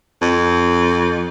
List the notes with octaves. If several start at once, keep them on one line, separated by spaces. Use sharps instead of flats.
F2